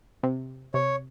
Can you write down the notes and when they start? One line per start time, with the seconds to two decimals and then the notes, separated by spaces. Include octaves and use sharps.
0.23 C3
0.74 C3 C#5